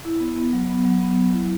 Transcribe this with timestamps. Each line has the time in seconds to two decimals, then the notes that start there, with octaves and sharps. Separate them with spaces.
0.05 E4
0.20 B3
0.36 B3
0.53 F#3
0.70 B3
0.85 F#3
1.01 B3
1.17 F#3
1.33 E4